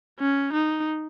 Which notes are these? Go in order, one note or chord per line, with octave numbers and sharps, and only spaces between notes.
C#4
D#4